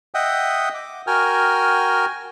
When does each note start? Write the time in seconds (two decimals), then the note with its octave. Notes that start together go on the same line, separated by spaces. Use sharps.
0.15 D#5 E5 F#5 G5 D#6
0.74 D6
1.07 F#4 A#4 G5 G#5 F6